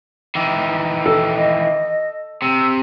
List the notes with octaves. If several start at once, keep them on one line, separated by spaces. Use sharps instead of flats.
D#3 E3
A4
D#5
C3 E6